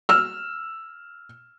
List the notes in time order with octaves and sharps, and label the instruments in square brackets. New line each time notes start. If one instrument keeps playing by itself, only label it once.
[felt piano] E6 F6